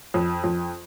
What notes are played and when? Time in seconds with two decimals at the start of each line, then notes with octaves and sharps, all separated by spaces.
0.14 F2
0.44 F2